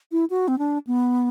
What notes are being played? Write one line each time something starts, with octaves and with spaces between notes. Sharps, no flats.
E4
F#4
C4
D4
B3